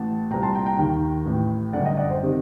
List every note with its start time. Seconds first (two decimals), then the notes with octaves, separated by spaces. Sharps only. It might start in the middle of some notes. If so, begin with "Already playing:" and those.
Already playing: A1 A2 F#5 A5
0.30 C2 A#2 G5 A#5
0.43 A5 C6
0.54 G5 A#5
0.66 G5 A#5
0.78 D#2 D#3 G5 A#5
1.26 A1 A2
1.73 G1 F#2 D3 D5 F#5
1.85 D#5 G5
1.97 D5 F#5
2.09 C5 D#5
2.23 C3 D#3